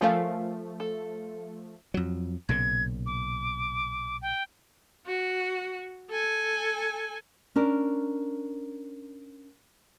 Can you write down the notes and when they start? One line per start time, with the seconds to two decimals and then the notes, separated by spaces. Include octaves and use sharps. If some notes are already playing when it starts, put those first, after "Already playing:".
0.01 F3 A3 C#4 A#4 F5
0.80 A4
1.94 F2 F#3
2.49 B1 A#2 C#3 G#6
3.06 D6
4.22 G5
5.06 F#4
6.09 A4 G#5
7.56 C#4 D4 A#4